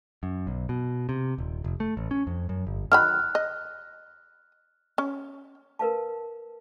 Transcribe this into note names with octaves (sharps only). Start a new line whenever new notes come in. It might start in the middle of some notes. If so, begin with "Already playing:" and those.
F#2
B1
B2
C3
D#1
F1
A3
A1
C#4
F2
F#2
G1
D#3 F#3 B5 F6 F#6
D#5
C#4
A#4 B4 F5 A5